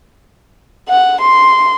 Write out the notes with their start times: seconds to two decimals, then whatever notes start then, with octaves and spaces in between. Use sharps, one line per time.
0.89 F#5
1.21 C6